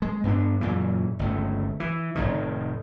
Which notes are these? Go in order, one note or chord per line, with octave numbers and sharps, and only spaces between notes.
G#3
G2 B3 D4
F#2 A#2 C#3 E3
G1 C#2 A3
E3
F1 A#1 A2 D#3